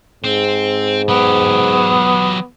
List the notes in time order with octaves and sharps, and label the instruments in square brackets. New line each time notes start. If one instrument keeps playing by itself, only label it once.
[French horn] G#2 [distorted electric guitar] C4
[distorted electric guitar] F#3 G4 [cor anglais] B3